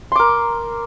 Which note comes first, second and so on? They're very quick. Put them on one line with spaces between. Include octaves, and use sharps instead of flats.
C6 D6 A#4